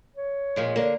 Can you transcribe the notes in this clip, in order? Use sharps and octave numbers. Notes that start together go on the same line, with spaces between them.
C#5
A#2 F3 G#3
D3 A#3